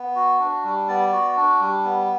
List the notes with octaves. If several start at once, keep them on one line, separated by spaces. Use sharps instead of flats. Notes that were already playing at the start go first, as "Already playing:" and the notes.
Already playing: B3
F#4
D4
G3
B3 D5
F#4
D4
G3
B3